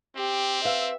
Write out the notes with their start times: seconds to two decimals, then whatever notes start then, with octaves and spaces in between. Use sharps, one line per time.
0.16 C4 G4
0.65 B4 E5 F5